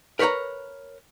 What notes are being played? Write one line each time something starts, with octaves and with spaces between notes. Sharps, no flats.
A#4 B4 C#5 F#5 A#5